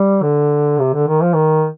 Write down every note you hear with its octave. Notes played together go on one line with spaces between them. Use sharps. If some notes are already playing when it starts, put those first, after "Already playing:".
Already playing: G3
D3
C3
D3
D#3
F3
D#3